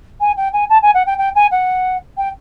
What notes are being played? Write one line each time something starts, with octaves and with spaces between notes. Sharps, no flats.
G#5
G5
G#5
A5
G#5
F#5
G5
G5
G#5
F#5
G5